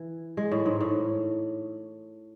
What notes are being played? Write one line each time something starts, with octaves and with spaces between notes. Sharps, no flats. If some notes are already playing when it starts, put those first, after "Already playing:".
Already playing: E3
G#3
A2
G#2
A2